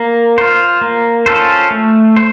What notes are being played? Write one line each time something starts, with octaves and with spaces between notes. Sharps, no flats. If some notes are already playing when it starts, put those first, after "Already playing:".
Already playing: A#3
F4 C5
A#3
C#4 F4 A4 C5
A3
C5